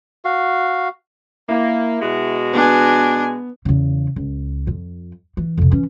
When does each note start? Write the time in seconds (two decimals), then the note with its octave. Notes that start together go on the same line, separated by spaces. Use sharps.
0.25 F#4 F5
1.49 A#3 E4
2.01 B2 G#3 F#4
2.53 B3 D4 G#5
3.65 E2 C#3
4.16 C#2
4.67 F2
5.37 E3
5.57 F2 C3
5.71 E3 C#4